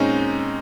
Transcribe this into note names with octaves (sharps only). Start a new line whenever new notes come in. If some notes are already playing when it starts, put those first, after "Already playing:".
Already playing: A#2 G#3 C4 C#4 D#4